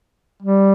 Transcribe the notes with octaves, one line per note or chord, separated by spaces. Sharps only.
G3